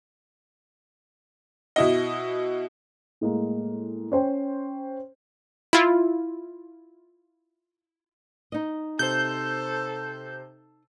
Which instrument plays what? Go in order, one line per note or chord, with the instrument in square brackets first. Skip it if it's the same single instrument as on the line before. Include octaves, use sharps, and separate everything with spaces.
[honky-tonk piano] B2 E4 D#5
[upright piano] A2 G#3 A#3
C#4 C5 G5
[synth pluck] E4 F4
[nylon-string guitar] D#4 D#5
[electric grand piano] C3 C5 [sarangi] A4 [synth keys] G6